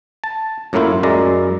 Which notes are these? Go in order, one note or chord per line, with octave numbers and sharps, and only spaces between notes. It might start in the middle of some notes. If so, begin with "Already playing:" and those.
A5
F#2 A2 F#3 A#3 E4 F4
F#2 G#3 D5 A#5